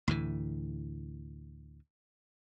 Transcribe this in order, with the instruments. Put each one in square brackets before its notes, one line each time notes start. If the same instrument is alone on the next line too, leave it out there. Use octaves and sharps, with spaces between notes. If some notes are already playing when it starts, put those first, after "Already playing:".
[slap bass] D2 A2 E3